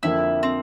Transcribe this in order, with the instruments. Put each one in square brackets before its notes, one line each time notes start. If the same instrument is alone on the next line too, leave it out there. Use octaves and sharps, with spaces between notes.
[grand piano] F2 D3 F3 A#3 [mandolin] E4
[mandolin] C4